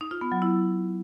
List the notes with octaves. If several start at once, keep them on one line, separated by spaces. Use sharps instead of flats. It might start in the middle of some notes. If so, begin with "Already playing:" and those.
D#4
F4
B3
F#3
E4